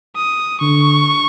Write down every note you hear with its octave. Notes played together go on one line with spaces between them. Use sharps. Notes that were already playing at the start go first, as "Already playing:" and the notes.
D#6
D3 C#6